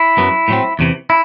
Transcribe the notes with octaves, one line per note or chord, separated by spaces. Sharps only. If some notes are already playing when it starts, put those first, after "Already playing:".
Already playing: E4
F#2 F#3 B3
A2 F#3 C4
E2 C3 E3
E4